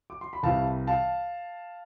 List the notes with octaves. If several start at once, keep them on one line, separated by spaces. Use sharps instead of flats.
D6
C6
B5
C2 C3 E3 G3 F5 A5
F5 A5